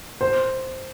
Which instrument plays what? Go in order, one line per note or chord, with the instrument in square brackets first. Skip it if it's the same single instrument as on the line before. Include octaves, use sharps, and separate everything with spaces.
[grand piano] C5